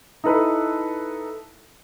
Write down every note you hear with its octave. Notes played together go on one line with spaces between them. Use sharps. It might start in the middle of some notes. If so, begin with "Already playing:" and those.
D#4 E4 A4 B4